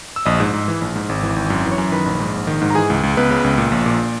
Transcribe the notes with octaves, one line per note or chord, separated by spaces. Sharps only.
E6
A#1 D#5 D#6
G#2
G#2
E3
A#1
G#2
G#1
E3
G#1
F#2
E3
C#5 C#6
F#2
D#3 B4 B5
A#1
G#2
A#1
D#3
G#2
A#5
E3 G#4 G#5
C#2
C#2
C#2 B3 B4
C#3
C#2
A#2
A#1
A#2